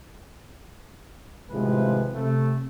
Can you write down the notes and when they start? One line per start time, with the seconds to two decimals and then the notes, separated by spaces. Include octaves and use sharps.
1.51 G#1 A2 C3 F3 G#3 B4
2.15 C3 A3